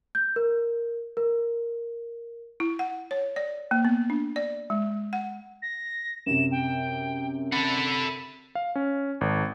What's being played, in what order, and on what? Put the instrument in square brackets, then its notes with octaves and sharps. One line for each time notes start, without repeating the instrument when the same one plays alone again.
[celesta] G6
A#4
A#4
[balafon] E4
F#5
C#5
D5
A#3
B3
D4
D5
G#3
F#5
[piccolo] A#6
[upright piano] F#2 C3 [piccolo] E7
[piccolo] G5
[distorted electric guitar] A4 F#5 [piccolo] B5
[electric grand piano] F5
C#4
G#1